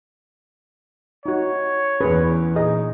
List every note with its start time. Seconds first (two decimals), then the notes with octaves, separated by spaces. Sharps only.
1.26 D#4 F#4 C#5
2.00 E2 E3 C#4 G#4 B4
2.56 A#2 D#4 G#4 D#5